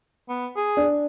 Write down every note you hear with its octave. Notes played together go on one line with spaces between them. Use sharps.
B3
G#4
D4